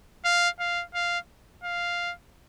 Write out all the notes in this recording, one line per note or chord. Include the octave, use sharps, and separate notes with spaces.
F5
F5
F5
F5